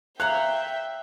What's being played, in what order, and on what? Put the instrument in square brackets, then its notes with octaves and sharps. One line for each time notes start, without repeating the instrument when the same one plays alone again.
[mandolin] C#5 F5 A#5 [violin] E5 G5 [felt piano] F#6